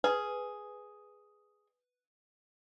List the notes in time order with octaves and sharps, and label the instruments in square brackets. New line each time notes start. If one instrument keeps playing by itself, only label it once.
[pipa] G#4 [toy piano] B4